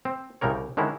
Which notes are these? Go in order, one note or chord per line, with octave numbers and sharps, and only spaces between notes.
C4
C2 C#3 G3 A#4 C#5
D3 D#3 G#3 C#4 E4